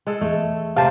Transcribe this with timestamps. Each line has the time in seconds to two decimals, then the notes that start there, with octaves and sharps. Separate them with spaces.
0.07 G#3 A4
0.21 E2 A3
0.76 C3 C5 D5 F5 A5